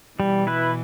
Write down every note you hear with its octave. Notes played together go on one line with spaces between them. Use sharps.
B2 E3 G3
E4 B4